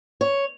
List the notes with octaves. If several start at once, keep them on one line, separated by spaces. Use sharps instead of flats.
C#5